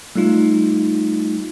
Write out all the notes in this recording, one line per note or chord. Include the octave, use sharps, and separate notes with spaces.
G3 A3 D#4 F4